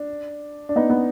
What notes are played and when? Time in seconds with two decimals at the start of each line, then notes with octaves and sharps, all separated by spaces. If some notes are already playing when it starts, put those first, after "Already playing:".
Already playing: D4
0.69 D4
0.76 B3 D#4
0.90 B3